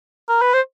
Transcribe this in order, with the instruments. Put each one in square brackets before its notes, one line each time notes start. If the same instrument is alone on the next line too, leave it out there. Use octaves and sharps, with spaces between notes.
[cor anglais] A#4
B4
C5